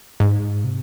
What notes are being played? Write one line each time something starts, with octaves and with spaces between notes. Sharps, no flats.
G#2
C3